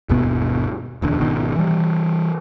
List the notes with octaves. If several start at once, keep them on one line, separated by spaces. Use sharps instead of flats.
G1 D#2 B2 B3
D#1 E2 D3
G#1 B2 D#3
E3 G3